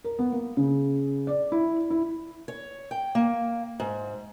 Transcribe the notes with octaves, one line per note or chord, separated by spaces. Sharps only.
A#4
B3
A#3
C#3
D5
E4
E4
C#5
G5
A#3
G#2